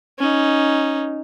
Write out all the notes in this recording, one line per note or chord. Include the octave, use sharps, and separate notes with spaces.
C#4 D#4